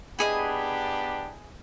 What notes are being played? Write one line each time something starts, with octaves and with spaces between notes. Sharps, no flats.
B3 D4 E4 G4 G#4 D#5